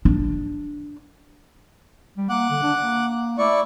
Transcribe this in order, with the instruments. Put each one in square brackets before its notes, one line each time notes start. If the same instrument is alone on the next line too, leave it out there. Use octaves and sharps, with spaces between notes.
[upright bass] D4
[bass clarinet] G3
[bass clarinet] A#3 [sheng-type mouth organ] F#5 D6 F#6
[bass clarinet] D3
D4
A#3
[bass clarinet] A3 [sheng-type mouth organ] E4 D5 C#6